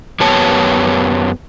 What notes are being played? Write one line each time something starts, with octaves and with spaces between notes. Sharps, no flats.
F#2 B3 G4 C#5 A5